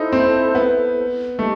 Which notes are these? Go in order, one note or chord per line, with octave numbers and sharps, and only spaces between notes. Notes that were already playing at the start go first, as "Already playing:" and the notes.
Already playing: D#4 E4 A4 C5
C4
B3
A3 D#4 G4 D#5 A5